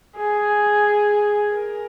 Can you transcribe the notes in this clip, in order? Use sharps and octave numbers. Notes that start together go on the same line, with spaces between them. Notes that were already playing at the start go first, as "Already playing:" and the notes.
G#4
A#4